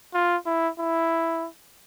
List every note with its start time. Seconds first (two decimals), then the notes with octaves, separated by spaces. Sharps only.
0.14 F4
0.46 E4
0.79 E4